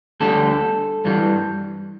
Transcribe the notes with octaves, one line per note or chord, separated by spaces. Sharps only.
D2 D3 G3 A4
G2 E3 G3